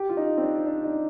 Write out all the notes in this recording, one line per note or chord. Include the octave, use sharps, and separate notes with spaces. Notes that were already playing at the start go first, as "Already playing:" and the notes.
Already playing: G4
F4
D#4
C4
D4
D4
D#4